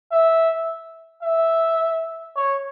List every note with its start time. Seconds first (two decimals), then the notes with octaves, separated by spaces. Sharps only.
0.12 E5
1.23 E5
2.36 C#5